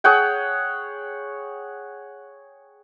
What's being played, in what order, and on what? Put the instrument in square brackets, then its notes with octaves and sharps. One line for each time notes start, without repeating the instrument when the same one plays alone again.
[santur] G#4 C#5 F#5 G5